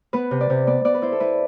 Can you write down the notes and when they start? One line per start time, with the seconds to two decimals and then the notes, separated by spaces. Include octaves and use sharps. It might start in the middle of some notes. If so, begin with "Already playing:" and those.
0.13 B3 B4
0.31 C3
0.41 D5
0.50 C3
0.67 B3 D5
0.85 B3 D5
0.94 B4
1.02 E4 C5
1.12 A4
1.20 E4 B4